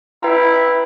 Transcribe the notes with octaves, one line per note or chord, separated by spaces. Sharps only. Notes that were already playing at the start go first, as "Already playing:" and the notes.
E4 B4 G5 A#5